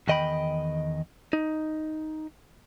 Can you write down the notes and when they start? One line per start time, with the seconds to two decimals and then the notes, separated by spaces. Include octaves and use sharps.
0.08 E2 D#3 D#5 G5 B5
1.33 D#4